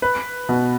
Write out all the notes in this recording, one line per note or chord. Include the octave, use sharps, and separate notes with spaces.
B4
B2